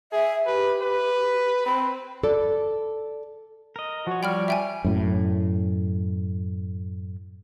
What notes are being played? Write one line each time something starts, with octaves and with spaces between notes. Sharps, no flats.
G#4 E5
G4 B4
B4
C4 B5
A4 D5
A#4 D#5
F3 F#4 C#5
G3 G5 B5 F6
E5 G5 G#5
F#2 A2